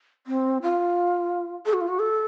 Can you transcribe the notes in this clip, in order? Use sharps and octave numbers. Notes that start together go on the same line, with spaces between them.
C4
F4
A4
F#4
F4
F#4
A4